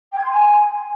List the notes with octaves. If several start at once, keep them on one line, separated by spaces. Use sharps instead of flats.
G5
G#6
C6
G#5